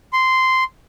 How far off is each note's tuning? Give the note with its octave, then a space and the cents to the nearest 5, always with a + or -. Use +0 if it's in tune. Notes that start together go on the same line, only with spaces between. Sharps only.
C6 -10